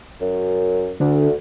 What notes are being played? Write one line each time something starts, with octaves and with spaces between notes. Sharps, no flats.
F#2
D2 D3 D4